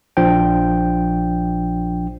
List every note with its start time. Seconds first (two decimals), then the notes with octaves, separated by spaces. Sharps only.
0.17 A#1 F3 D4 G5